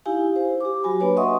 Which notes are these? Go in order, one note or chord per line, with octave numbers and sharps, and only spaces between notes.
D#4 E4 G4 F5 G#5
C5
G4 D6
F#3 F#4 G#5 B5
A#3 D4 F#4 B4 C#5 G#5
D#5 E5 F#5 C6 C#6 D#6